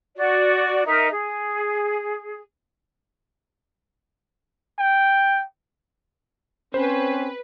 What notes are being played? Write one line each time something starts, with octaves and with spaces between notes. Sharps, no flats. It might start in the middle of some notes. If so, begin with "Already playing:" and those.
F#4 D5
D#4 A#4 E5
G#4
G5
C4 C#4 B4 C5